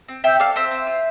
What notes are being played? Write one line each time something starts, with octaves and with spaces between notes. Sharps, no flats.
C4
C4 E5 G5
A4 D5 F5
C4 C5 E5
C4
F4